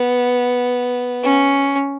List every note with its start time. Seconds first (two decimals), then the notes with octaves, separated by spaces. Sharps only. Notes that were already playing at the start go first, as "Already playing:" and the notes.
Already playing: B3
1.23 C#4